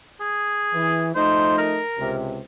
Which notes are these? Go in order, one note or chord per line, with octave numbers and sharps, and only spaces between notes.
G#4
E3
F3 A3 D#4 C5
A#4
C#2 C3